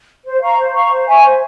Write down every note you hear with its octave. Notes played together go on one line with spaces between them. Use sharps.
C5
F5 A#5 C#6
C5
F5 A#5 C#6
C5
E5 G#5 C#6
C5